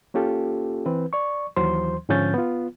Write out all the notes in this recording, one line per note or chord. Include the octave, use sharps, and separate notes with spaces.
A#3 C#4 F4 G4 A4
E3 C4 B4
D5 C#6
D#2 E3 F#3 C5 C6
G#2 D3 F3 C#4 G6 A6
B3 F4